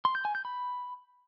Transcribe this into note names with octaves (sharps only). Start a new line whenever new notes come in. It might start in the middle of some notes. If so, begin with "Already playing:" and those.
C6
G6
G#5
G6
B5